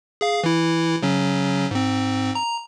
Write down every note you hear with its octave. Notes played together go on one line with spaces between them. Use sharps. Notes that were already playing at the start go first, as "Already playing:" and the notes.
G#4 F5
E3 E4
C#3 F#3 C#4
G#2 C4
A#5